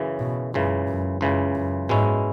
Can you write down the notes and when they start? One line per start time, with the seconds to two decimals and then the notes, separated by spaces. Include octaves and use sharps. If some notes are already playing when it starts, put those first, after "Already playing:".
Already playing: F#2 C#3 E3
0.20 B2
0.54 C#2 F#2 C#3 E3
0.87 F#2
1.21 C#2 F#2 C#3 E3
1.55 F#2
1.89 G#2 B2 G#3 C#4 E4